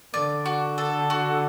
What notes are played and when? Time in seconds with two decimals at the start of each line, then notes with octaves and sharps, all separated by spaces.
0.14 D3 D5
0.46 F#4
0.78 A4
1.10 F#4